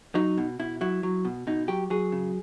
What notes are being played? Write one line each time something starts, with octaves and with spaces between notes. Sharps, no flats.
F#3 D#4
B2
B2 E4
F#3 E4
F#3
B2
B2 D#4
F#3 G4
F#3 G#4
C#3